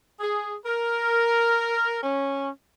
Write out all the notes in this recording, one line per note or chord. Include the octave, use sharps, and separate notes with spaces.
G#4
A#4
C#4